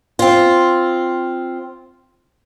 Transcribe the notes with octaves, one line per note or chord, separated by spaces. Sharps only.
C4 F4